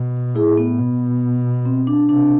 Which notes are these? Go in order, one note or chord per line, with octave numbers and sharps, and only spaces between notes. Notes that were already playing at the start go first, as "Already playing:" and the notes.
Already playing: B2
A2 E4 G#4
B3
B2
C4
D4
C3 D4